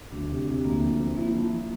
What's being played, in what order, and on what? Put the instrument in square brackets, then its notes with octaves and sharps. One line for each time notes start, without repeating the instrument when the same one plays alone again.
[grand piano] D2 [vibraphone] D4
[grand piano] C3
C3
[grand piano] D2 [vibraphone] A#3
[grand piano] F3
C4
[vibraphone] A#3 [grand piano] E4
[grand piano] F3
F3